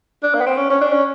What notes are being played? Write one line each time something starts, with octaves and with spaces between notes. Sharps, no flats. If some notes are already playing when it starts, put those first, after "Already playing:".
D4
A#3
B3
C4
C#4
C#4
D4
C#4